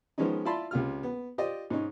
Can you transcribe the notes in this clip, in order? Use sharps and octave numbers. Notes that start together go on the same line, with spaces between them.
D#3 F3 G#3 B3 C#4 D#4
E4 F4 D5 A5 B5 C6
C#2 C3 F4 F6
B3
F4 G4 C5 D5 D#5
G#2 C#4 D#4